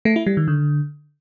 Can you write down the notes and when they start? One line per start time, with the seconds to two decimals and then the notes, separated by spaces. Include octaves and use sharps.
0.05 A3
0.16 E4
0.26 G3
0.37 D#3
0.48 D3